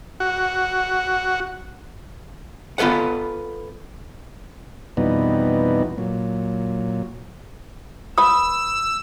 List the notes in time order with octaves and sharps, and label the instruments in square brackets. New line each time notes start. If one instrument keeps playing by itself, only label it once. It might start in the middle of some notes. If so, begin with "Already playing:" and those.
[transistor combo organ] F#4
[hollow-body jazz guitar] B3 F4 A4 B4 F#5
[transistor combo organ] F2 B2 E3 G3 B3 D#4
A#2 F#3
[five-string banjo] B4 B5 [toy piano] D#6 [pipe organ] E6